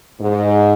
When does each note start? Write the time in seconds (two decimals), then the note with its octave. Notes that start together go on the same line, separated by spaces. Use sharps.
0.21 G#2